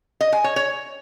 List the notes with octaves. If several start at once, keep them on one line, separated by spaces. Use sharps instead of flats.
D#5
G#5
C#5
C#5